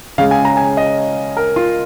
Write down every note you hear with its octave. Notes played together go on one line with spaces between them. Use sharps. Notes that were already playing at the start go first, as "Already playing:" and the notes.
C#3 G#3 C#4 F5
G#5
A#5
G#5
D#5
A#4
F4